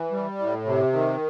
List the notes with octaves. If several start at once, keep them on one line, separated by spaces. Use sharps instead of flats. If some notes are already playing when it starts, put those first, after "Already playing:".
Already playing: E3
G3
A2
C3
D#3